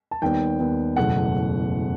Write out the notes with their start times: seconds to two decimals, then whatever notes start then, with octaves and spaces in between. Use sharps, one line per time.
0.11 A5
0.22 D#2 D#3 G3 B3 G5
0.59 D#2 D#3 G3 B3
0.96 F#1 E2 B2 A3 F#5